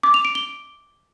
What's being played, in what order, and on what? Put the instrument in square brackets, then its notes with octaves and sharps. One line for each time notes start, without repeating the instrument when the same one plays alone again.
[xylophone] D6
F7
D7
G7